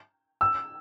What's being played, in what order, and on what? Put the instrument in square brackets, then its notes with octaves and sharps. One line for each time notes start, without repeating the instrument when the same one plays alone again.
[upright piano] E6